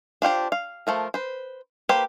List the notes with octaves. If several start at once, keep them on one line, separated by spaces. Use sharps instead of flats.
D4 F4 G4 C5
F5
F3 A3 F4 A#4
B4 C5
A#3 G4 B4 C5